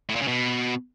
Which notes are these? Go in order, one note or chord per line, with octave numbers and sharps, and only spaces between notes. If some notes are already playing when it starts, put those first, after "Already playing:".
A2
A#2
C#3
B2